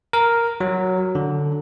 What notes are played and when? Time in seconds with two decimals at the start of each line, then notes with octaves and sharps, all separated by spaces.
0.13 A#4
0.61 F#3
1.15 D3